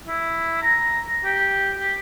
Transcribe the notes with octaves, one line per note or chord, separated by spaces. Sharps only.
E4
A#5
G4
G4